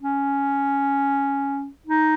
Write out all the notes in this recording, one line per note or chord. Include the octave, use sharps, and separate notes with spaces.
C#4
D#4